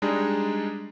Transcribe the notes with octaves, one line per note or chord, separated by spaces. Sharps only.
G3 G#3 D4 D#4 G#4